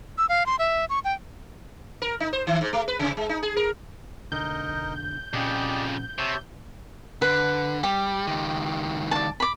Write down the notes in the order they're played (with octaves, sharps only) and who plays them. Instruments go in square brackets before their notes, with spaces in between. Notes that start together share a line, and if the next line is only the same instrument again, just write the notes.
[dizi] E6
F5
C6
E5
C#6
G5
[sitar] A#4
D#4
C5
D#3
G#2
A3
B4
C3
G#3
D#4
G#4
A#4
[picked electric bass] F1 B1 D3 [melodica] D#4 A#4 [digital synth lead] G6
[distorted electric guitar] F2 C#3 [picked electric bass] A#2 C#4 [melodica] G4 D5 D#5
[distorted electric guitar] C3 [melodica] C#5 E5 A5
[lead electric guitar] D3 [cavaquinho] B4
[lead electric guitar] G3 [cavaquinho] G4
[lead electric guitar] C#2 D#3
[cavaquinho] D5 A5
B5 D6